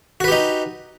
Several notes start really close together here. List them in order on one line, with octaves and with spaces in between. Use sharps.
F#4 B4 G4 D#4